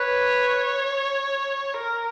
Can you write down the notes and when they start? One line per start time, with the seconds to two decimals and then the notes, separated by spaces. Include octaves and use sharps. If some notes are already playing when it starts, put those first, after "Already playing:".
Already playing: B4 C#5
1.76 A#4